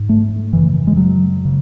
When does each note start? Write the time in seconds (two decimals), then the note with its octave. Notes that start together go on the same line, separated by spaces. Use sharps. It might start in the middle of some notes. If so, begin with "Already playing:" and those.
Already playing: G#2
0.09 A3
0.53 F#2 C#3 E3
0.87 G#3
0.97 F#3
1.45 C#3